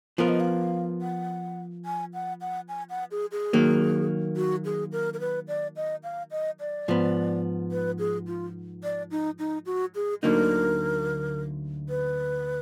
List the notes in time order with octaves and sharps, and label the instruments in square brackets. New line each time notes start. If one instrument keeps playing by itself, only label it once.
[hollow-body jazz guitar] F3 B3 F4 A#4 [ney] F5
[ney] D#5
F5
F#5
G#5
F#5
F#5
G#5
F#5
G#4
G#4
[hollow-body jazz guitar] D#3 F#3 A#3
[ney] F#4
G#4
A#4
A#4
B4
D5
D#5
F5
D#5
D5
[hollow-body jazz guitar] G#2 F3 B3
[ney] B4
G#4
F4
D5
D#4
D#4
F#4
G#4
[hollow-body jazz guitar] D2 D3 F#3 A#3 D#4 [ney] A#4
[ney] B4